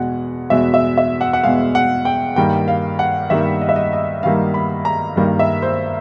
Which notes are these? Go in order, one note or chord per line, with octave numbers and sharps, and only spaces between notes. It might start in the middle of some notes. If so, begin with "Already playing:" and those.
Already playing: E2 B2 G#3 F#5
E2 B2 G#3 E5
E5
E5
F#5
F#5
E2 B2 G#3 F5
F#5
G5
G2 D#3 G3 A#3 G5
F5
F#5
G2 D#3 G3 A#3 E5
D#5
E5
D#5
D#5
G2 D#3 G3 A#3 F5
B5
A#5
G2 D#3 G3 A#3
E5
C5